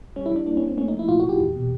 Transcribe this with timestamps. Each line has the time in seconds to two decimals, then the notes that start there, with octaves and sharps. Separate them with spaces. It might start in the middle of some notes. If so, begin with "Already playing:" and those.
0.16 G3 C#4
0.26 E4
0.31 G3 D4
0.46 A#3 D4
0.57 C#4
0.63 A#3 C4
0.77 A3 C#4
0.88 D#4
0.93 F3
0.99 E4
1.08 A#2 F4
1.20 F#4
1.25 A#2 G4
1.40 E2
1.56 B2